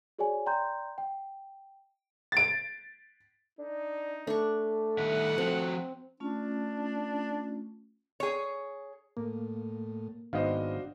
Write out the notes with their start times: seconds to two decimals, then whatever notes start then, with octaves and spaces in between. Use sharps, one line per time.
0.19 F#4 G#4 C#5 D5 G#5
0.46 D5 G5 A#5 C6 G6
0.98 G5
2.32 A6 D7
3.59 D4 D#4
4.27 A3 D4 C#6
4.98 D#3 G3 E5 F#5
5.38 F3 C4 F#4
6.20 A3 C#4 D4 F4
8.20 G#4 C#5
9.17 A2 A#3
10.33 G#1 G#2 B3 D4 F#4 C5 D#5 F5